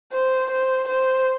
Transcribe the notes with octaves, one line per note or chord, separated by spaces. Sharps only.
C5
C5
C5